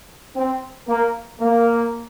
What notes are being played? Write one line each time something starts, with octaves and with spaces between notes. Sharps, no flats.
C4
A#3
A#3